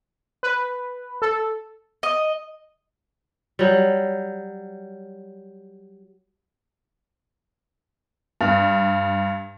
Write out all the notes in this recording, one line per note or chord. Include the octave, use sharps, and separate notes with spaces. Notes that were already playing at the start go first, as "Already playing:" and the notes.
B4
A4
D#5
F#3 G3
G2